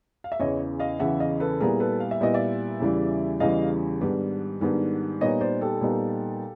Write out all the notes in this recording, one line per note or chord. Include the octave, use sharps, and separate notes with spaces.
F5
E5
E2 C#3 E3 C#5 D#5
D#5 F5
E2 C#3 E3 E5 F#5
D#5 F5
A4 B4
A#2 G3 B3 E4 G#4 A#4
A4 B4
F5
E5
A#2 G3 B3 E4 D#5
D5 E5
E2 C#3 E3 G3
E2 C#3 E3 G3 D#5 F5
G#2 D#3 G3 B3 D4
G#2 D#3 G3 B3 D4
A#2 G3 B3 D#4 C#5 D#5
C5 D5
G4 A4
A#2 G3 B3 D#4